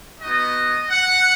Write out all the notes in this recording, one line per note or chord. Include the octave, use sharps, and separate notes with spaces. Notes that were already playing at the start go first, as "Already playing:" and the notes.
B3 D#4 F#4 D#5
F#5